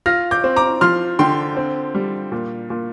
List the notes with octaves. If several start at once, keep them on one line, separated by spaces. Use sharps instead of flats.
F4 F6 A#6
D6 G6
C4
A#5 D6
F3 C6 F6
D3 G5 C6
C4
G3
A#2
A#2